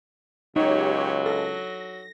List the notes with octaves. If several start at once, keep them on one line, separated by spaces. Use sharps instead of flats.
C#2 F#3 D#4 G4 C#5
A4 A#6